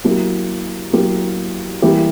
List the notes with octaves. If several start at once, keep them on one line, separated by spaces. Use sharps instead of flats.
F#3 A#3 E4 G4
F#3 A#3 E4 G4
E3 G3 A#3 E4 G4